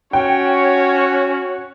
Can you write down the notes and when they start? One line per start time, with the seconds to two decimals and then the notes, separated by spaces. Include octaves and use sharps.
0.13 C#4 F#4 C#5 G5